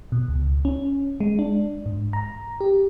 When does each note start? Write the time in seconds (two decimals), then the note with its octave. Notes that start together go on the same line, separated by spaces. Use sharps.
0.12 B2
0.28 C#2
0.65 C#4
1.20 G#3
1.39 D4
1.86 G#2
2.13 A#5
2.61 G4